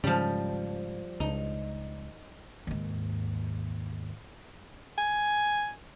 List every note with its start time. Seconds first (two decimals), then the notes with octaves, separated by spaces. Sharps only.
0.04 G#2 C#3 F3 G3
1.20 C#2 D#4
2.67 D#2 G#2
4.98 G#5